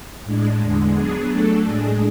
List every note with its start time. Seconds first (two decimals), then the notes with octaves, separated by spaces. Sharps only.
0.24 A2 G#3 D4
0.59 E2 D3 G#3
0.94 F#3 B3 D4 G#4
1.30 F#3 A3 D4 A4
1.65 A2 G#3 D4 G#4